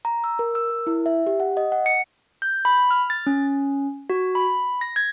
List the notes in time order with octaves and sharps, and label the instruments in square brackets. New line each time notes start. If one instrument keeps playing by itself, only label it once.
[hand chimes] A#5
E6
A#4
E6
A#4
E4
E5
G4
F#5
D#5
F#5
C#7
[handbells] G6
B5
F6
A6
C#4
F#4
B5
A#6
G#6